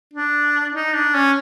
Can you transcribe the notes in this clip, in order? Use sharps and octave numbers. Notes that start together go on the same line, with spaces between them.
D4
D#4
D4
C#4